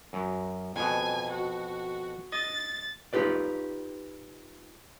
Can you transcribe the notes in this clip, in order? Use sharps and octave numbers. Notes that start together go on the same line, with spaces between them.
F#2
F2 B2 G#5
F#4
D#5 A6
D#4 F4 G4 B4 D5